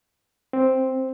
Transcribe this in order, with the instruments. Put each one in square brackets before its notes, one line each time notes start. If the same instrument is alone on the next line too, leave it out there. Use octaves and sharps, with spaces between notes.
[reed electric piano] C4